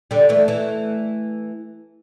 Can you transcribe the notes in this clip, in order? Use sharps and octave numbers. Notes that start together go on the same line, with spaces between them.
D3 G3
E3 A3
E3 A3